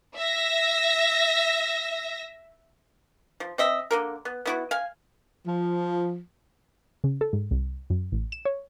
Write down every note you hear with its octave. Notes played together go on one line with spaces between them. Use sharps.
E5 A#6
F3
C4 D#5 E5
D3 A#3 A#4
B3
B3 E4 F#4
F5 G#5
F3
C#3
A4
G#2
C2
F#2
A1
E7
C#5